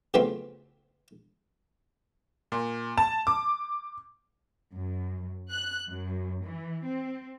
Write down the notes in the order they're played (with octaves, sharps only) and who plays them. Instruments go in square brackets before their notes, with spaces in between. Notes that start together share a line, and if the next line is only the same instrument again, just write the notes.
[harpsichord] C#3 F3 F#3 A3 B3 C4
[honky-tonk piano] A#2
A5
D6
[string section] F#2
F#6
F#2
E3
C4